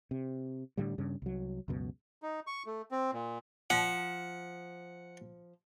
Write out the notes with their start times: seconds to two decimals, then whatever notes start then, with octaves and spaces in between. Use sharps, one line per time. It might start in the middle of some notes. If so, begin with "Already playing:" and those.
0.11 C3
0.77 A2 D3 G3
0.98 G2 C#3
1.22 C2 F#3
1.68 C#2 F#2 B2
2.22 D#4
2.47 C#6
2.66 A3
2.91 C4
3.13 A#2
3.70 F3 F#5